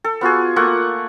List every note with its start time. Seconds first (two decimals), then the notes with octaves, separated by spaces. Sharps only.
0.04 A4
0.21 B3 F4 F#4 G#4
0.56 A3 A#3 F4 F#5